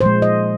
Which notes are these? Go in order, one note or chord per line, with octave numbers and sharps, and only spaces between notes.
A#2 F3 G#3 C5
D#5